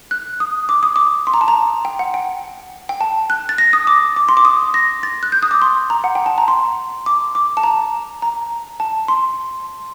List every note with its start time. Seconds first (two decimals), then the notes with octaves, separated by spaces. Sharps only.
0.11 F#6
0.40 D#6
0.69 D6
0.83 D#6
0.96 D6
1.27 C6
1.34 A#5
1.41 A5
1.48 A#5
1.85 G5
1.99 F#5
2.14 G5
2.89 G5
3.01 A5
3.30 F#6
3.49 A6
3.58 A#6
3.73 D#6
3.87 D6
4.16 D6
4.29 C6
4.37 D6
4.45 D#6
4.74 A#6
5.03 A6
5.23 F#6
5.32 G6
5.43 D#6
5.51 D6
5.62 C6
5.90 A#5
6.04 F#5
6.15 G5
6.26 A5
6.38 A#5
6.48 C6
7.06 D6
7.35 D6
7.57 A5
7.63 A#5
8.22 A#5
8.80 A5
9.08 C6